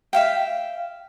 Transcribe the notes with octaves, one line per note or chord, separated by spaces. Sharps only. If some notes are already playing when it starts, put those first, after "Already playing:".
E5 F5 G5